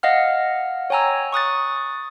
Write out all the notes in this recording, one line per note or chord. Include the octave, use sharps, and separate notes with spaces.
D#5 F5 F#5 F6
C#5 G5 G#5 A#5 E6
C#6 D#6 F#6 A6